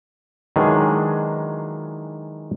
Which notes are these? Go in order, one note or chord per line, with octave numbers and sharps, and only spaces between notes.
D#3 E3 F#3 G#3 D4 G#4